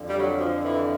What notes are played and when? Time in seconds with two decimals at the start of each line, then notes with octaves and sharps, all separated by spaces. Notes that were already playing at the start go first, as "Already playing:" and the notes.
Already playing: F2 D3
0.08 G3
0.17 F#3
0.39 F3
0.63 E3